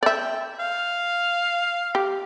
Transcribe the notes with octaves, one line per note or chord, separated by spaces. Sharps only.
D5 E5 G5
F5
G4